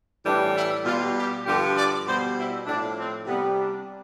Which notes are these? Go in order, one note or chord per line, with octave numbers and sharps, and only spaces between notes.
A2 E3 G3 D4
E4
B2 G3 F4
G4
G2 D3 F3 G4
D5
B2 G3 C5
E4
A2 F3 D4
C4
C3 G3 B3
D4